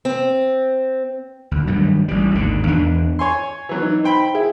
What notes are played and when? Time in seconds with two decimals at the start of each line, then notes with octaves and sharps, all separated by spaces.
0.05 C4
1.51 D2 B2
1.67 G2 D#3 F#3
2.08 A1 G3
2.35 G#1 D#2 D3
2.67 E2 B3 D4
3.19 C#5 G#5 C6
3.69 E3 F#3 B3
3.83 D#4
4.04 C5 G5 B5
4.35 E4 G#4